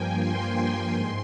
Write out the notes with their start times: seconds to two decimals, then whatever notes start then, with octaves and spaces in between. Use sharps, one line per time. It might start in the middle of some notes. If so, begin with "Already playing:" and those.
Already playing: G2 F3 A#3 G5 G#5
0.20 C6
0.93 G#2 C6